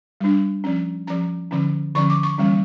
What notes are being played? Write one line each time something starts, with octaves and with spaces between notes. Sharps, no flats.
G3 D4
F3 C#4
F3 C#4 A#5
D3 F3 C#4
D3 F3 C#4 C#6
D6
C#6
E3 G3 A#3 C#4